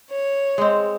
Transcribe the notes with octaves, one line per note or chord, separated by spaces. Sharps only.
C#5
G#3 C4